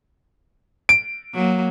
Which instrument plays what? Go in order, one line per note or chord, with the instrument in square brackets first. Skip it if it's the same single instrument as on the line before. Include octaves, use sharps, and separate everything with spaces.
[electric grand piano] D7
[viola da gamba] F#3 A#3